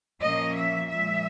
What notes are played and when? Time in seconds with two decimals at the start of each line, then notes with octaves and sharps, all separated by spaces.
0.23 A#2 F3 A#3 C#4 D#5
0.56 E5
0.89 A#2 F3 G#3 E5